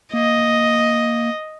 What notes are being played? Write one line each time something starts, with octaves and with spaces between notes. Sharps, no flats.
A#3 D#5